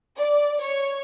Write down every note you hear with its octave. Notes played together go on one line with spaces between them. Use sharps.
D5
C#5